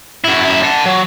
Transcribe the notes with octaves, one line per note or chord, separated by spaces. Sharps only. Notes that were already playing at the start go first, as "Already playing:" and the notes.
F#2 E4
F#5 A5
F#3